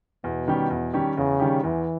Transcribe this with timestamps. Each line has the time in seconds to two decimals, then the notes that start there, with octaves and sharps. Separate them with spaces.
0.24 E2 B2
0.48 D#3 G3 C#4 G4
0.70 E2
0.94 D#3 G3 C#4 G4
1.17 E2 C#3
1.40 D#3 G3 C#4 G4
1.63 E2 E3